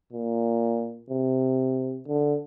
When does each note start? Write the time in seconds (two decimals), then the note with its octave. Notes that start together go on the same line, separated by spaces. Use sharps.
0.12 A#2
1.10 C3
2.07 D3